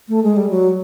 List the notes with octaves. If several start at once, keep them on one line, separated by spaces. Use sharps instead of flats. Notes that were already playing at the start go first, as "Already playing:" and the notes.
A3
G#3
G3
F#3